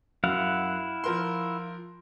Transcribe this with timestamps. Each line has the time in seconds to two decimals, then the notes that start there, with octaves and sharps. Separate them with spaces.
0.24 F#2 E4 F5 F#5
1.04 F3 A#4 C6